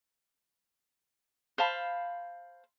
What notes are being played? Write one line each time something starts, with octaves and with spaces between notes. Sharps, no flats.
C5 F5 A5 B5